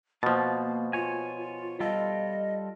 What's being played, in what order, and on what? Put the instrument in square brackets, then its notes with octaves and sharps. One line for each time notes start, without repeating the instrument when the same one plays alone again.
[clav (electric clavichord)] B2 F3 [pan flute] A#3 [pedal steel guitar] A5
[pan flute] F4 [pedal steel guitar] C#5 G#5
[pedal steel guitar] G3 F4 A4 [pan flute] D#5